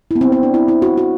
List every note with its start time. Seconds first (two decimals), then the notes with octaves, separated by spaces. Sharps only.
0.11 E4
0.15 B3
0.21 C4
0.32 C4
0.43 D4
0.54 E4
0.68 E4
0.82 F#4
0.98 F#4